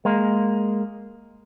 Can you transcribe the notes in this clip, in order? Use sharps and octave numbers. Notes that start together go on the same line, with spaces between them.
G#3 A#3